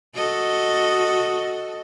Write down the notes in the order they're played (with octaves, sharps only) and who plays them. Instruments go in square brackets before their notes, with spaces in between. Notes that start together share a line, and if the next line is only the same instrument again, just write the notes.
[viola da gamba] F#4 A4 D#5